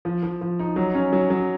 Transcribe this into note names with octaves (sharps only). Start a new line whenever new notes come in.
F3
F3
F3
D#4
F#3
C#4
F#3
F#3